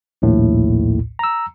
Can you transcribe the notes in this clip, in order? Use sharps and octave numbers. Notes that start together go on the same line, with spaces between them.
A#1 D#2 A2
A#5 E6